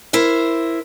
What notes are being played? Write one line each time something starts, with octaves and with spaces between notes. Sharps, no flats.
E4 A#4 C5